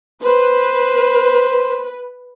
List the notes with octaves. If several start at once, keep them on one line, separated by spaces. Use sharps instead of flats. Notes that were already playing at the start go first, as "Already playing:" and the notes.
B4 C5